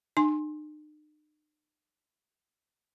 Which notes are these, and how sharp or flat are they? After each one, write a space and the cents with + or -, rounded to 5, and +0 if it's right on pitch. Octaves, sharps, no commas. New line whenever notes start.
D#4 -45 G#5 +0 C6 +25